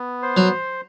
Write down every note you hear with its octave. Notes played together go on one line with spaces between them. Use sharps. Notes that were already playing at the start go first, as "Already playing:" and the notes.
Already playing: B3
C5
F#3